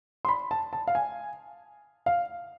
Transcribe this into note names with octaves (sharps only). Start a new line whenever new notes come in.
C6
B5
A5
A5
F5
G#5
F5